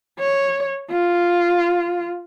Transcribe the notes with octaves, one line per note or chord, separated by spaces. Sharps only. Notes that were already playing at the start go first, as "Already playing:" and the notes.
C#5
F4